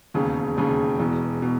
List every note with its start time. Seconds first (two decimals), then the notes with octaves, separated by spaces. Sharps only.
0.14 E1 D#2 C#3
0.57 E1 D#2 C#3
0.99 E1 E2 B2
1.42 B2